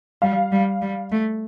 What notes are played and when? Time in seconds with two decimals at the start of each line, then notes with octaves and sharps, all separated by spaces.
0.22 G3 F5
0.52 G3
0.82 G3
1.11 A3